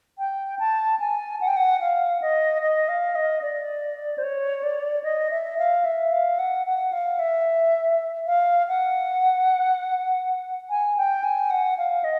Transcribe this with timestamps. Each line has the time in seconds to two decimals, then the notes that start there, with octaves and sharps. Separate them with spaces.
0.19 G5
0.59 A5
1.00 G#5
1.41 F#5
1.48 G5
1.57 F#5
1.81 F5
2.22 D#5
2.62 D#5
2.88 F5
3.15 D#5
3.42 D5
4.18 C5
4.23 C#5
4.63 D5
5.04 D#5
5.30 E5
5.58 F5
5.85 E5
6.11 F5
6.39 F#5
6.66 F#5
6.93 F5
7.19 E5
8.27 F5
8.68 F#5
10.70 G#5
10.97 G5
11.24 G#5
11.50 F#5
11.78 F5
12.04 D#5